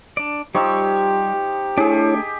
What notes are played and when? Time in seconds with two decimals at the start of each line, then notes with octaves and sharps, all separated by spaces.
0.17 D4 D5
0.55 F3 G3 D#4 G4 C#5 E6
1.77 A3 D4 E4 G4 G#4 C#5